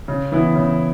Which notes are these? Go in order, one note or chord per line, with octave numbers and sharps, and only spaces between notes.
C#3
E3 B3 E4
C#3